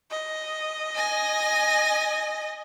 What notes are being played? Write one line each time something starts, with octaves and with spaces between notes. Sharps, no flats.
D#5
G#5 A#6